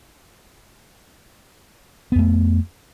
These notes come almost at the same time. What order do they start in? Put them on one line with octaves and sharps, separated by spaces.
B3 F2 A3